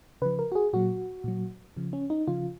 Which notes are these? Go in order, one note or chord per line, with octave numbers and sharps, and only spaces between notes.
C#3 F3 B4
A#4
F#4
G#4
A#2 F#3 F#4
A#2 F#3
C#3 F3
C#4
D#4
C#3 F3 F4